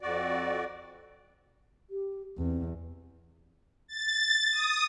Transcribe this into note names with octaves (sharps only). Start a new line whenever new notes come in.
F2 F#4 D5
G4
E2 C4
A6
D#6